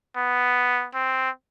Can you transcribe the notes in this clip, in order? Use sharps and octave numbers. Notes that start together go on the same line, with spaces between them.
B3
C4